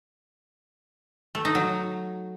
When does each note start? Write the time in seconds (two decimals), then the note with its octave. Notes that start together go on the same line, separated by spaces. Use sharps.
1.35 A3
1.45 D#4
1.55 F#3